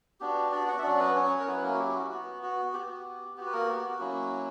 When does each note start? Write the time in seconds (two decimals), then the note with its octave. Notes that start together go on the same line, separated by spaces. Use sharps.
0.20 B3 D4 F#4 G4
0.52 D4 D5
0.68 F#4 F#5
0.78 E5
0.83 F#3 C#4 D4 F#4 D5
1.00 B3 B4
1.15 C#4 C#5
1.40 A#4
1.47 F#3 B3 C#4 E4 B4
1.63 A#3 A#4
1.74 F#4
1.78 G4
1.95 F#4
2.10 B3 F#4
2.42 F#4
2.74 B3 F#4 G4
3.37 B3 F#4 G4
3.46 B4
3.53 A#3 A#4
3.69 G4
3.80 G4
3.85 F#4
4.00 F#3 A#3 C#4 E4